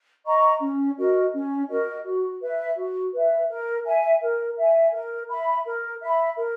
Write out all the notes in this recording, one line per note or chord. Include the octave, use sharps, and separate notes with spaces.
D#5 A#5 C#6
C#4
F#4 A#4 D#5
C#4
F#4 A#4 D#5
F#4
B4 E5
F#4
B4 E5
A#4
E5 G#5
A#4
E5 G#5
A#4
E5 B5
A#4
E5 B5
A#4